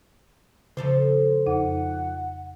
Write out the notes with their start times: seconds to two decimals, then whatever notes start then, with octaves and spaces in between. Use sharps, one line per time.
0.77 C#3 F3 A4 C5
1.46 F2 D#4 F#5